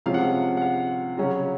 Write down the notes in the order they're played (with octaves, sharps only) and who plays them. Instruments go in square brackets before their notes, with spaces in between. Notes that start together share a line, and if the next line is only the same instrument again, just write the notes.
[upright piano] C3 F3 G#3 C#4 F5
F#5
F5
F#5
F5
C#3 F#3 C#4 F#4